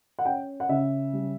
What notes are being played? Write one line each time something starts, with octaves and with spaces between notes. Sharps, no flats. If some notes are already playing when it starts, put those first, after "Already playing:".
F#5
C#4 G5
F#5
C#3 E5
G3